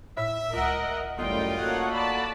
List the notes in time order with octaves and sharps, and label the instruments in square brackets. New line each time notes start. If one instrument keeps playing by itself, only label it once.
[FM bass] A2 [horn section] E5
[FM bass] C#2 [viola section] A#4 D#5 F#5
[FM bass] G1 [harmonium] F#2 A2 G3 [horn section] D#4 F4 [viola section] G5
[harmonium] A#3 F#4 A4 [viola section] C#5 F#5
[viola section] D5 A5 B5